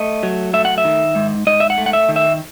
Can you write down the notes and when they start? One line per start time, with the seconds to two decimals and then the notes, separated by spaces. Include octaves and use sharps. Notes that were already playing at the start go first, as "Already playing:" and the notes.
Already playing: A3 D#5
0.23 F#3
0.53 A3 E5
0.65 F#5
0.78 E5
0.85 D#3
1.15 G#2
1.47 G#2 D#5
1.60 E5
1.70 F#5
1.77 A3
1.86 F#5
1.93 E5
2.09 D#3
2.16 E5